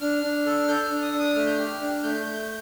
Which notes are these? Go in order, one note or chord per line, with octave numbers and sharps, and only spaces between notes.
D4 F6
D4
A4
A4 G6
D4 F6
D#6
D4
D#6
A3 F6
G6
G4 F6
D4
A3 G6
A3